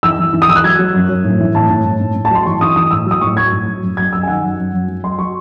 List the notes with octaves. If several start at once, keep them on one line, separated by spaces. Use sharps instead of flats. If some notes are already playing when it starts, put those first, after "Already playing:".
E3 E6
E3
E3
D#6
E3 E6
F#6
F#3 G#6
F#3
F#2
F#2
A2
E3
A2 A5
A2
A2
A2
A2
A5
F#3 C6
E3 C#6
E3 D#6
E3 D#6
A2 E6
F#3 D#6
A2 C#6
F#3 G#6
A2
F#3
F#2
F#2 G#6
F#2 E6
G#5
D#3 F#5
F#2
F#2
F#2
F#3
F#3 C6
F#3 C#6